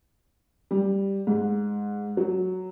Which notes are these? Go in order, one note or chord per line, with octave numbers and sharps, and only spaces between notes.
G3
G#2
F#3